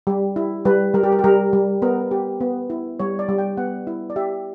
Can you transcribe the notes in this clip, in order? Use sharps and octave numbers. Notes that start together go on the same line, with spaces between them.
G3 G4
E4
G3 B4
G3 A#4
G4
A#4
G4
G3 A#4
G3
B3 A#4
G4
B3
E4
G3 C#5
D5
G3
G5
B3 F#5
E4
D5
G4 E5